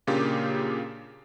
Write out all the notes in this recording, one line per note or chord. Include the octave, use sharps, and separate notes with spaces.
A#2 C#3 A#3 D4 F4 G4